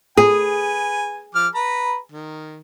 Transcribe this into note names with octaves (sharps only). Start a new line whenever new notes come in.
G#4 B4 G#5
F3 D6 F6
B4 A#5 B5
D#3